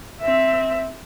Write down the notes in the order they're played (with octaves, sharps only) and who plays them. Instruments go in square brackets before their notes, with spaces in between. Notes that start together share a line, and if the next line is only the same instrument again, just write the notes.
[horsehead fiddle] C4 E5